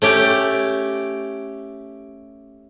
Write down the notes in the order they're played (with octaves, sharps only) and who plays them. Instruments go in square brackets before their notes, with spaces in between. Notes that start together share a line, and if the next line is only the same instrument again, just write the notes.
[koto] A3 C#4 G4